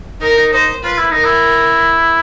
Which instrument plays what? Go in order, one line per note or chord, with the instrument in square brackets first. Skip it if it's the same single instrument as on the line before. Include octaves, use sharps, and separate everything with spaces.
[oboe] D#4 [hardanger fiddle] A#4
[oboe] D#4
[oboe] D#4 [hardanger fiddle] C5
[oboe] F4 [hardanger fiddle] B4
[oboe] E4
[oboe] D#4 [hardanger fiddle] A#4
[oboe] E4